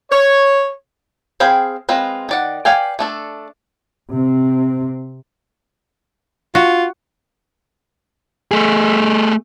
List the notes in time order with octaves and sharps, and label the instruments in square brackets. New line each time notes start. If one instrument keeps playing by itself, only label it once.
[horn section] C#5
[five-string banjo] C4 G#4 F5 G5 B5
G#3 C4 F4 B4 D#5
D#3 D5 F#5
B4 D5 F5 G5 G#5
A3 D4 A4
[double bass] C3 C4
[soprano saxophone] F4 [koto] F#4
[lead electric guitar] A3 G#4